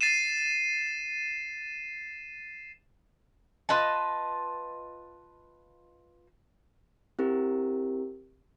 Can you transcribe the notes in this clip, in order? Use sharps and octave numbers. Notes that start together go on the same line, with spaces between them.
A6 C7 D#7 E7
F4 B4 D#5 A5
C4 E4 G4 A#4